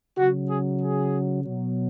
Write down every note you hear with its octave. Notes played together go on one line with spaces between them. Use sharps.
C#3 F#3 F#4
G#4
G#4
B2 F#3